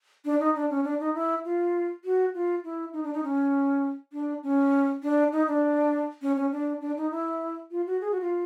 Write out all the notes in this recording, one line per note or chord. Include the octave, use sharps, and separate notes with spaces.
D4
D#4
D4
C#4
D4
D#4
E4
F4
F#4
F4
E4
D#4
D4
D#4
C#4
D4
C#4
D4
D#4
D4
C#4
C#4
D4
D4
D#4
E4
F4
F#4
G#4
F#4
F4